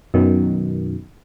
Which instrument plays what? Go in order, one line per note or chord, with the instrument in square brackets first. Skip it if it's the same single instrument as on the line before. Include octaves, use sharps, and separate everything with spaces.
[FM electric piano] F#2 B2 D#3